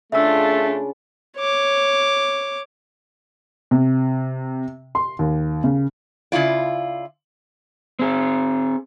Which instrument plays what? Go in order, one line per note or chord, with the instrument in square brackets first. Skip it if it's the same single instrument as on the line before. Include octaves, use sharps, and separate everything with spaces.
[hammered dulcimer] C#3 [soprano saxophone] A3 [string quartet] D4 F4 [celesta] E5 E6
[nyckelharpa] C#5 D6
[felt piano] C3
C6
D#2
C#3
[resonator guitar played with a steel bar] C#3 E4 F4 D5
[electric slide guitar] C4 G#4